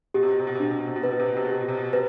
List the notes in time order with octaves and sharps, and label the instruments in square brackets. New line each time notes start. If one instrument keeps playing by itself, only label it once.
[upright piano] B2 [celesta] G4
[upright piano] C3
B2
C3
B2
C3
[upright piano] B2 [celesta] D4
[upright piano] C3
B2
C3
B2
[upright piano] C3 [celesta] B4
[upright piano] B2
C3
B2
C3
B2
[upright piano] C3 [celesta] G4
[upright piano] B2
C3
B2
[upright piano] C3 [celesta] B4